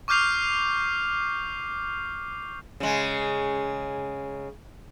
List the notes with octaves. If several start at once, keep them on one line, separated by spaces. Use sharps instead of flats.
C#6 D6 F6 G6 C7 F7
C#3 G#3